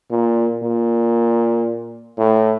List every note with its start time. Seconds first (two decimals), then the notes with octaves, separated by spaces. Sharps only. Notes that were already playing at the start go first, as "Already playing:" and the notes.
0.11 A#2
0.63 A#2
2.18 A2